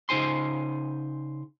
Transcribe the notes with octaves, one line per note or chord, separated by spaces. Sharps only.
C#3 D#4 C5 G#5 C6